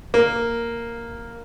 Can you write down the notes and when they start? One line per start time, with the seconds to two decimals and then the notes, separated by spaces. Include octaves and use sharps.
0.14 A#3